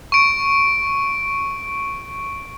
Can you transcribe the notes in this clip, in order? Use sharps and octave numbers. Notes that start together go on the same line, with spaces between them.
C#6 D7